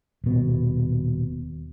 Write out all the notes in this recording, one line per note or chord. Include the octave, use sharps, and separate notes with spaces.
D#1 B2